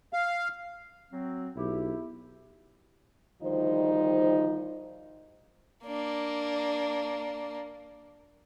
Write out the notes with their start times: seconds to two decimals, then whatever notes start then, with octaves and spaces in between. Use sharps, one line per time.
0.13 F5
1.12 F#3 C4
1.56 B1 E4 G4
3.42 D2 D#3 F3 G3 D#4 C5
5.86 A#3 D4